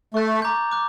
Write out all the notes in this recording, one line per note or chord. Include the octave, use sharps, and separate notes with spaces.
A3 C#6 F#6 A6
A#5 D6 G6
D6 F#6